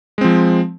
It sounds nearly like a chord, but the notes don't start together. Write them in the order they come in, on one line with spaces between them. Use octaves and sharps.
G#3 C4 F3